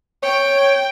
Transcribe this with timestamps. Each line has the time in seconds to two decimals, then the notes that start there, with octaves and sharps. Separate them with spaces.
0.22 C#5 G5